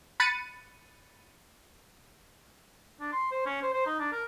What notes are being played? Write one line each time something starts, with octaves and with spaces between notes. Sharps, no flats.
B5 F#6 A6 C#7 D#7
D4
C6
C5
C#4
C5
C5
D#4
D4
A#4